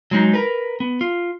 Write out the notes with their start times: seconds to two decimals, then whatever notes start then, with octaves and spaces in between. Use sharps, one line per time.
0.11 F#3 G#3 D#4
0.34 A#4 B4
0.80 B3
1.01 F4